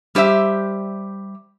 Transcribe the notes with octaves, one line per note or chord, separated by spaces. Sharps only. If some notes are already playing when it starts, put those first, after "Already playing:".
G3 G4 C5 E5